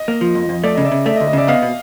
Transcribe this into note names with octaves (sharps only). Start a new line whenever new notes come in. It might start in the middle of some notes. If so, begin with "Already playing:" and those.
Already playing: D#5
A#3
F3
F2
F2
A3 D5
D#5
C#3
D5 E5
C#3
A3 D5 E5
D#5
D2
D#5
C#3 D5 E5
B3 D#5 F5
B2